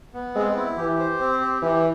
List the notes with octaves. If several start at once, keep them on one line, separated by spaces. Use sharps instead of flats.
B3
G#3 C4
E4
E3 G4
C5
C4
G4
E3 G4